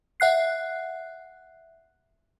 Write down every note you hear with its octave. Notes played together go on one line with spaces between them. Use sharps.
E5 F#5 F#6 C7